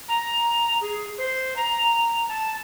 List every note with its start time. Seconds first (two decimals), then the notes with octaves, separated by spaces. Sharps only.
0.08 A#5
0.81 G#4
1.18 C5
1.56 A#5
2.28 A5